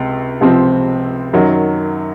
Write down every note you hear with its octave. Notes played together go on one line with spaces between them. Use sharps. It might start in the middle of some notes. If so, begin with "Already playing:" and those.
Already playing: C#2 C3
C#2 C3 F3 C4
F#2 D#3 F#3